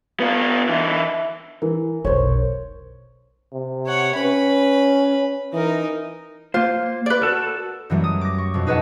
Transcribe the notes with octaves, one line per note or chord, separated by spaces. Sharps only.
B3 F4
D3 E3
E3 A#4
F1 B1 C5 C#5
C3
C#5 F#5
C#4 B4 B5
E3 D#4 A#4
A#3 F4 C5
B4 D5
F#4 A4 A#4
F#2 E3 F#3 G3 A3
D#6
D6 A#6
C#6
F2 B2
D#4 G#4 B4 D#5 F#5 A5